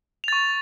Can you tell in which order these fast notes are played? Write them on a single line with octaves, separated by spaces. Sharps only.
F7 A6 C#6